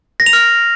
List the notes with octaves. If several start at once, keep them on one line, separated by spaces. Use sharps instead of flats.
A#6
F7
F6